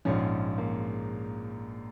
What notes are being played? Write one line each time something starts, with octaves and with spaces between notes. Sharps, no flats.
A#1 G#2 F3 C#4
A#3